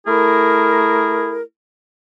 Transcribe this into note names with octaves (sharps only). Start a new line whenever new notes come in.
A3 E4 G#4 A#4